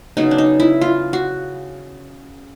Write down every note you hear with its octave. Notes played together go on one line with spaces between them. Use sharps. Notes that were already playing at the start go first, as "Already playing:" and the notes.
C#3 F#3 B3 D#4
D4
D#4
E4
F4
F#4